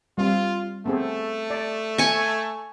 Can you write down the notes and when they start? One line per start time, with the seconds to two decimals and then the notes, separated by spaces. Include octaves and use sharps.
0.18 G3 C4 F4
0.86 A3 B3 C4 G#4
1.50 D5
1.98 G#5 C#6